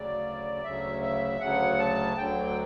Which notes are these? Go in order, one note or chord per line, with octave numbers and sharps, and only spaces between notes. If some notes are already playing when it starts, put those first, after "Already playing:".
Already playing: D2 C#3 F#3 D5
D2 C#3 F#3 E5
E5
D2 C#3 F#3 F#5
A5
D2 D3 F#3 G5